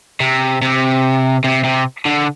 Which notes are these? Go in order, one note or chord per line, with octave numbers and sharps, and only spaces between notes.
C3
C3
C3
C3
D3